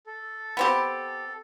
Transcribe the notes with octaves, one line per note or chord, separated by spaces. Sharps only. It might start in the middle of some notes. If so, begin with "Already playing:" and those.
A4
B3 C4 G4